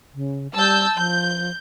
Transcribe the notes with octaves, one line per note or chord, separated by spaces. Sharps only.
C#3
G3 A5 E6 G6
F3 G6